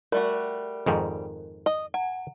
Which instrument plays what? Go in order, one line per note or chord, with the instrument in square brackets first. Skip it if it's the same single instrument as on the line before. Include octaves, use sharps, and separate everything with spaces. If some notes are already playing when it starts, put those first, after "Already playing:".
[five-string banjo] G3 A3 F#4 [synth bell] A#4
[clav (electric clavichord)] F2 G#2 D#3
[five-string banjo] D#5
[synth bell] F#5 [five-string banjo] G#5